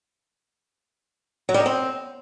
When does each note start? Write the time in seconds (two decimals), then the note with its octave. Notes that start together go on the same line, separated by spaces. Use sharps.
1.49 F#3
1.54 G3
1.60 D#4
1.66 C4